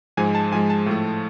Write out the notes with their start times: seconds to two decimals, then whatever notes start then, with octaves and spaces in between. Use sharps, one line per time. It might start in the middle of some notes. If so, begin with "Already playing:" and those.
0.17 G#2 F3 G#3 G#5
0.35 A5
0.51 G#2 F3 G#3 G#5
0.70 A5
0.86 A2 F3 A3